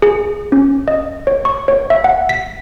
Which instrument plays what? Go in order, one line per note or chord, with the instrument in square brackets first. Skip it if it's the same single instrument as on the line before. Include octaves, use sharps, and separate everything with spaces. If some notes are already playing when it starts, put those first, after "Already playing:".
[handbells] G#4
C#4
D#5
C#5
C#6
C#5
E5
F#5
B6